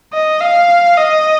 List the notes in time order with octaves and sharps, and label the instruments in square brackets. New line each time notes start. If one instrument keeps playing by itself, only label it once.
[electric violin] D#5
F5
D#5